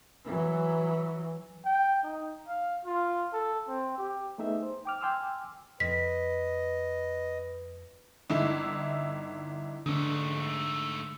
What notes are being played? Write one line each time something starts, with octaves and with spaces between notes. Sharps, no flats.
E3 F#3
G5
D#4
F5
F4
A4
C4
G4
A3 B3 D#4 G#4 E5
C5
G5 D6 F6
G5 G#5 C6 D6 E6 F6
F2 B4 D#5 B6
G1 D#4 E4 E6
G#2 D3 A3 D4